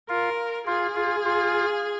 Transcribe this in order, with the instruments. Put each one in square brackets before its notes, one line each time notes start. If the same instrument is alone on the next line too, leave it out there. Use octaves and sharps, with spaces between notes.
[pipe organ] F4 [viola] A#4
[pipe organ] F4 [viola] G#4
[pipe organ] F4
F4